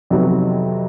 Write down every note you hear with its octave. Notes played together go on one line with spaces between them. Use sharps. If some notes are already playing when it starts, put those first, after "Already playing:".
F2 C3 D#3 F#3 B3